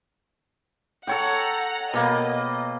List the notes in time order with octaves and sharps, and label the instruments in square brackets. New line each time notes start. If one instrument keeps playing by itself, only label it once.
[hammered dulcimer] A4 C#5 G5 [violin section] F#5 A#5
[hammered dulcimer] B2 A#3 [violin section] D#5